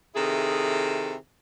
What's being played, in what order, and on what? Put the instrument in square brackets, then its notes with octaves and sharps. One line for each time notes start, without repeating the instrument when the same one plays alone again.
[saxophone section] C3 D#3 E4 G#4 A4